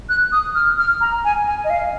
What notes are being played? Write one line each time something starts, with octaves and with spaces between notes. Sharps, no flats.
F#6
D#6
F6
F6
A#5
G#5
G#5
D#5
F5